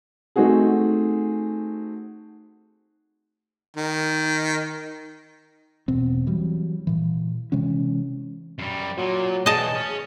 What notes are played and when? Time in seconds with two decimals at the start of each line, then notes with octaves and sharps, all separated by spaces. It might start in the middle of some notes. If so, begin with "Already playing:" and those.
0.36 A3 C4 D#4 F#4 G#4
3.76 D#3
5.88 E1 B2 C4
6.27 E3 F#3 G3
6.87 A#2 E3
7.52 C3 E3 G#3 C#4
8.59 F#2 G3
8.98 A#2 F#3
9.46 B2 E3 G#4 D#5 A5
9.76 C#4